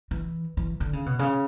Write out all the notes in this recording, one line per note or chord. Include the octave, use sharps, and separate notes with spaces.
E3
E3
D3
C#3
B2
C#3